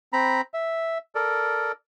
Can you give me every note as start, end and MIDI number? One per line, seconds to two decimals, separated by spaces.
0.13 0.41 60
0.13 0.41 82
0.13 0.41 83
0.54 0.98 76
1.15 1.72 69
1.15 1.72 70
1.15 1.72 74